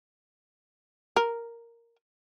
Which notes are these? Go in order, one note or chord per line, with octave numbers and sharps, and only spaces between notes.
A#4